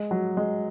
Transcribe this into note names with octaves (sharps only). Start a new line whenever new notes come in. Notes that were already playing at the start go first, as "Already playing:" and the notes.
Already playing: G#3
F#3
G#3